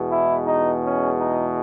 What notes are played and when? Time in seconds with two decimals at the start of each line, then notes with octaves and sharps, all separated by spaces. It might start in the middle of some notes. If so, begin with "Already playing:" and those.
Already playing: E2 B2 G#3
0.09 E4
0.46 D#4
0.83 C#4
1.20 D#4